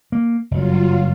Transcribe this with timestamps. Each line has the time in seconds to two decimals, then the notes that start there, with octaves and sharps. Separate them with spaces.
0.12 A#3
0.51 F#1 G2 F#3 F4